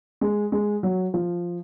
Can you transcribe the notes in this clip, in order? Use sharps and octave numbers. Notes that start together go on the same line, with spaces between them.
G#3
G#3
F#3
F3